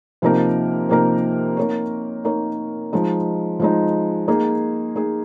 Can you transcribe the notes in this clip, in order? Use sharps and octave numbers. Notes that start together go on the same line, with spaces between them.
C3 F3 A#3 D#4 A#4
C3 F3 A#3 D#4 A#4
A#3 D#4 A#4 C#5
A#3 D#4 A#4 C#5
F3 G#3 D#4
F3 G#3 D#4
A#3 D#4 G#4
A#3 D#4 G#4